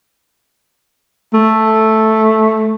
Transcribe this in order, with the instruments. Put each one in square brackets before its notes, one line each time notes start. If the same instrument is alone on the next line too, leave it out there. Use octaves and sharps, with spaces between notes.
[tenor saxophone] A3